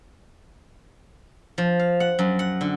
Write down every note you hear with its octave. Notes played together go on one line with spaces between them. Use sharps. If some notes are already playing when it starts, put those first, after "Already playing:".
F3
F5
F#5
F#2
F#5
D3